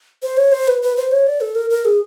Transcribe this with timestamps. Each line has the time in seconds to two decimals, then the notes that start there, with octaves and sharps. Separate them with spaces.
0.23 C5
0.37 C#5
0.52 C5
0.68 B4
0.82 B4
0.97 C5
1.11 C#5
1.27 D5
1.41 A4
1.55 A#4
1.70 A#4
1.85 G#4